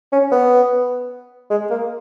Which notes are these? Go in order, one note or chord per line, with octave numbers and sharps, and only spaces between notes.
C#4
B3
G#3
A#3